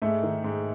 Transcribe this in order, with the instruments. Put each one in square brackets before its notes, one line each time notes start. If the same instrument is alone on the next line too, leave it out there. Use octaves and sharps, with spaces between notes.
[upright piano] G#2 A3
D#3
G#2